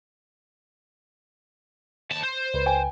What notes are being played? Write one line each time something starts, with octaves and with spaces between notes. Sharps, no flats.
D#2 A5
C5
C#2 B4
G5 G#5